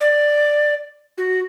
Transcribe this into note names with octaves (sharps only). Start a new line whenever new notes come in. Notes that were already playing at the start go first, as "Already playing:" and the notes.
D5
F#4